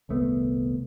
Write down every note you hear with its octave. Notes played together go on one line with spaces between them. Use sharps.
D#1 C2 A3 B3